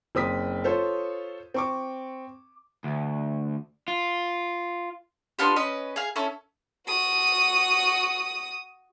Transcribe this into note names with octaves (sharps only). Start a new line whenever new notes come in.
F#1 C4 D#6 B6
F4 A4 C5 C#5
C4 C#6 D6
D2
F4
B3 D4 F4 G4
C#4 B4 D#5
G#4 F5
C#4 E4 A4
F#4 D#6